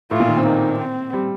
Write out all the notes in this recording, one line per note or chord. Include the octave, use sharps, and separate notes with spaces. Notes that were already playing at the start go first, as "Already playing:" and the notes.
A2 F4
A#2
D#3
C4
A#3 D#4
C4
G3